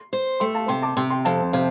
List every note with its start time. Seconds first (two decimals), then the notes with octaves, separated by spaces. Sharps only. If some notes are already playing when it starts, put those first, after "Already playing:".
Already playing: C6
0.13 C5
0.40 A3 G5 C6
0.55 F5 A5
0.68 C3 G5 C6
0.82 A5 D6
0.97 C3 G5 C6
1.10 G5 C6
1.25 F2 F5 A5
1.53 C3 C5 F5